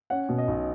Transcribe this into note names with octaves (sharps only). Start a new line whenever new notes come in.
C#4 F#5
B2
D#5
B1